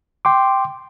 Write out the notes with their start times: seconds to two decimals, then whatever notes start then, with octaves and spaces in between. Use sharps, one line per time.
0.25 G5 C6 D6